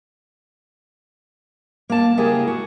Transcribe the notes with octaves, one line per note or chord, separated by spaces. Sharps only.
A#3 A5
C#3 G#3 A#3 E4 G4 G#4
F#4